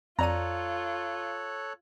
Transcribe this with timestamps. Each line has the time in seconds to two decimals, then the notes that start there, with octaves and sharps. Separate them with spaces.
0.19 F2 F4 A4 C#5 D5 A#5 F#6 D#7